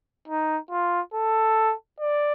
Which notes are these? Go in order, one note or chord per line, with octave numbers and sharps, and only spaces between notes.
D#4
F4
A4
D5